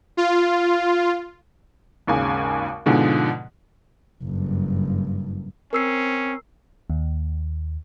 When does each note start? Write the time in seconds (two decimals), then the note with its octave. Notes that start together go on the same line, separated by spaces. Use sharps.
0.17 F4
2.07 G#1 D#2 C#3 G#5
2.86 G#2 B2 D3 F3 G#3
4.23 F#1 G2
5.73 C4 C#4 A#4 E6 C7
6.90 D#2